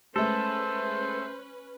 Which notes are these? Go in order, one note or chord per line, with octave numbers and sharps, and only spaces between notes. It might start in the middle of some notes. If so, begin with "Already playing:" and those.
G#3 A3 C#4 A4 B4 C5